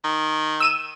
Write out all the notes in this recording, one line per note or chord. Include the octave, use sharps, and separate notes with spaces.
D#3
E6 D#7 E7